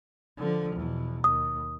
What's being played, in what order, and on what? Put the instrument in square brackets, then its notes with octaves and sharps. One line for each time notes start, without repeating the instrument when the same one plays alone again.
[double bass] D3 F3
E2 B2
[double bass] D#2 [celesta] D#6